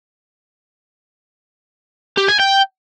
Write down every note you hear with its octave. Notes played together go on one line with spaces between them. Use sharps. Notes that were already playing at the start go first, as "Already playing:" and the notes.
G4
G#5
G5